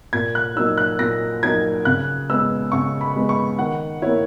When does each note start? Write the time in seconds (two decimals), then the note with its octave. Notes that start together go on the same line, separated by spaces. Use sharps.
0.13 A#2 G#6
0.35 F#6
0.56 F#3 A#3 D#4 E6
0.78 F#6
0.99 A#2 A#6
1.43 F#3 A#3 D#4 G#6
1.85 C#3 F#6
2.29 G#3 B3 E6
2.72 C#3 C#6
3.01 B5
3.16 G#3 B3
3.29 C#6
3.59 D#3 F#5
4.02 A#3 E4 C#5